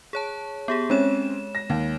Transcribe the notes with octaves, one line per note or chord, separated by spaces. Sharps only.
G#4 C#5 A5
B3 G4 G#4
G#3 C4 C#4 C#5 E7
A#6
D#2